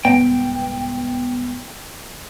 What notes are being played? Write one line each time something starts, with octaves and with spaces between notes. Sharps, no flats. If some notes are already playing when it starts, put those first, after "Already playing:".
C2 G#2 B3 G5